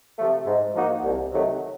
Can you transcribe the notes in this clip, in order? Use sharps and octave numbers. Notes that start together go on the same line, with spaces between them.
C3 F3 A3
G#2
F3 A#3 D#4 F#4
C2
C3 D#3 F#3 A3